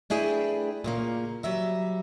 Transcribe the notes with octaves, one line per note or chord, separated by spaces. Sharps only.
A3 D4 E4 G#4 B4 G5
A#2 C#3 A#3
F#3 G3 E5 A#5